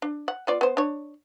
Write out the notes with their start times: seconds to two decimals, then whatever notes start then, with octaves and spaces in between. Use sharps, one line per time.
0.02 D4
0.28 F#5
0.47 B3 F4 D5
0.61 B3 C5
0.77 D4 C#5